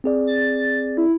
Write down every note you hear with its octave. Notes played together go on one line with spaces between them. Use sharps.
C4 G#4 D5
A6
E4